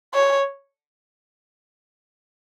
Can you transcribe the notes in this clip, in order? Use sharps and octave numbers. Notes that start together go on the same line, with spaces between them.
C#5